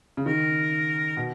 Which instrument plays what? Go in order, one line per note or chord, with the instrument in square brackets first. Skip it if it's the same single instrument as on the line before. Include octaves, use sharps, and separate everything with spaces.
[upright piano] C#3
[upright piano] D#3 [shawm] A#4
[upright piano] B2